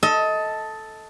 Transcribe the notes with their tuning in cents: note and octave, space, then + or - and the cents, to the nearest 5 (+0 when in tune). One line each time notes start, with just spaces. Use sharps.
A4 +0 D#5 +25